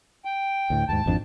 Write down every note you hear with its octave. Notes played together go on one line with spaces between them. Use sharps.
G5
D2 A2
D#2 G#2 A5
G#1 F2 D4